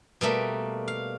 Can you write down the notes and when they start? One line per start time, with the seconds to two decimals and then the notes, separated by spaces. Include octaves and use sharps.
0.21 B2 G3 A3 A#3
0.88 F5